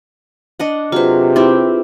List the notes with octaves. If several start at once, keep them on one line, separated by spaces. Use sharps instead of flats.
D4 D#5 F#5
C3 F#3 F4 G#4 B4 C5
C4 E4 G4